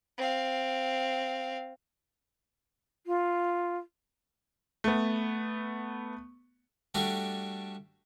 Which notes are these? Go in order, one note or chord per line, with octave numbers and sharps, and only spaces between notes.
C4 F5
F4
A3 B3
G3 A3 D4 F#4